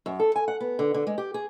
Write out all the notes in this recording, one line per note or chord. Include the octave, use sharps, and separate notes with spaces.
F#2
A4
G#5
F#5
B3
D3
D3
G#3
G4
G#4